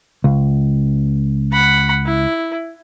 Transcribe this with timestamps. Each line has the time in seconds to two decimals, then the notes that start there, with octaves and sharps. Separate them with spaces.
0.24 C#2
1.52 F#5 B5
2.06 E4